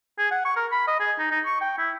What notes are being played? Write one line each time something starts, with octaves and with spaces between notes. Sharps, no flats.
G#4
F#5
C#6
A#4
B5
D#5
G#4
D#4
D#4
C#6
G5
E4